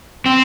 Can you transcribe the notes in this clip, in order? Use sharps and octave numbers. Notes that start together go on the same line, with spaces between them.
C4